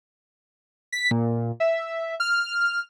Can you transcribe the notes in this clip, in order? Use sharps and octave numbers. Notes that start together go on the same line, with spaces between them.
B6
A#2
E5
F6